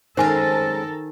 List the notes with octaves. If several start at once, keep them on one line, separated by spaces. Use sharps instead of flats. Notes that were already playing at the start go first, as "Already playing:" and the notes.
D#3 G#3 C4 C#4 A4 A#4 C5 G#5